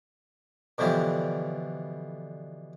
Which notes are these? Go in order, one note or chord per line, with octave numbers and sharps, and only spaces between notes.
B2 D3 E3 F3 G3